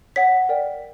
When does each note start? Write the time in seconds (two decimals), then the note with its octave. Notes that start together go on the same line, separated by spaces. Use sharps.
0.16 C#5 F#5 B6
0.49 A#4 D5 G5